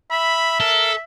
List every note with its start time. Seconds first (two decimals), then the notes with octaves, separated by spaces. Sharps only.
0.11 E5 B5
0.60 A4 A#4